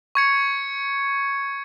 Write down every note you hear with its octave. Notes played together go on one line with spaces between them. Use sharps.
C#6 G#6 C#7